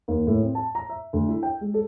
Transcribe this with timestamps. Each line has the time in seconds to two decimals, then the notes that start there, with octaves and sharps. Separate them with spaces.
0.08 D#2
0.27 A2
0.42 C4
0.55 A5
0.75 A#5
0.89 E5
1.13 D2
1.28 E4
1.43 G5
1.61 G#3
1.74 A4